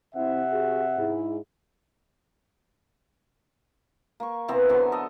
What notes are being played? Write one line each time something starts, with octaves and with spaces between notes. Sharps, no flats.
C3 C4 E4 E5 F#5
F#4 G#4
G#2 E4 G#4
A#3 C#6
C3 E3 B3 C4
D3 F#3 B3 G#5
A4 D#5